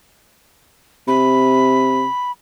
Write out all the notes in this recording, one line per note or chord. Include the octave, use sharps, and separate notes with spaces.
C3 B5